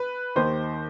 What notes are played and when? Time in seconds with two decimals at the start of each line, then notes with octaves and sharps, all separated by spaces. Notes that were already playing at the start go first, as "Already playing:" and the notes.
Already playing: B4
0.36 D#2 D#3 C5